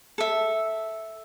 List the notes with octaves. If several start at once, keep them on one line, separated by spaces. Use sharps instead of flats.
A4 E5